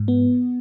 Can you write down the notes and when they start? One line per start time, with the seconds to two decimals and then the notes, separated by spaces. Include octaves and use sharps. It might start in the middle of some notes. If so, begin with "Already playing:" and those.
Already playing: G#2
0.08 B3